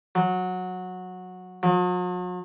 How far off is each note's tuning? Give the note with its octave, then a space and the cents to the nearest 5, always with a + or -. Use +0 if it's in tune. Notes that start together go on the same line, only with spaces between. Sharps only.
F#3 -15
F#3 -45